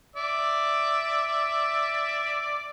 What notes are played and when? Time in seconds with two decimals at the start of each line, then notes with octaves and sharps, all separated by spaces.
0.16 D5 E5